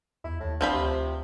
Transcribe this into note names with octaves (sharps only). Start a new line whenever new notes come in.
E2 E4
D#2 A2
C2 F3 C4 F4 B5
D2 C3